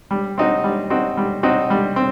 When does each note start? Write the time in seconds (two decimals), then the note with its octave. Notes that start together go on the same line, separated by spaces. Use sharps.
0.11 G3
0.38 C4 D#4 F#4
0.64 G3
0.90 C4 D#4 F#4
1.17 G3
1.43 C4 D#4 F#4
1.70 G3
1.96 C4